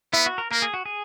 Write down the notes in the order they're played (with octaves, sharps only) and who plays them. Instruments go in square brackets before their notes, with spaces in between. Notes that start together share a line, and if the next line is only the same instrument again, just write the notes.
[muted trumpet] B3 [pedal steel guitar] E4
[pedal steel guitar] F#4
A#4
[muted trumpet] A#3 [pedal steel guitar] A#4
[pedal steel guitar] G#4
F#4
G#4